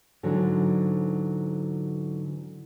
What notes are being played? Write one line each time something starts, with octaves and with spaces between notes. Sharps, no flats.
G#2 D3 E3 F#3